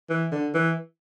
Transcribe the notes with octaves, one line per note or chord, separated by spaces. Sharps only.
E3
D3
E3